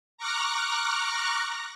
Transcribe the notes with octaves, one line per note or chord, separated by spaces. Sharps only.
A#5 C#6 D6 F6 F#6 A#6